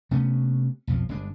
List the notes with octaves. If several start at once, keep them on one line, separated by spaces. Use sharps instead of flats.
C3 A3 B3 C#4
B1 F2 F3
G1 G2 G#3 D4